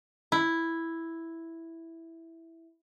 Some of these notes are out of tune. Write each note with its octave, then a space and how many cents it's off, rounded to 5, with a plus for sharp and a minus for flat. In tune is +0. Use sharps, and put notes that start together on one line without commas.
E4 +0